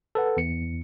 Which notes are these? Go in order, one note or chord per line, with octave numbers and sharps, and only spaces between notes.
A4 B4 F#5
E2 C#7